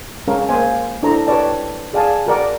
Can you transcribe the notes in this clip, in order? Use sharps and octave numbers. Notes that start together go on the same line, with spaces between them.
G#3 C#4 G#4 A#4 F5
A#3 C#4 C5 F5 G#5
D4 E4 A4 C5 A#5
G4 B4 C#5 D5 A5
G#4 D5 F5 G#5 A5
F#4 A#4 D5 F#5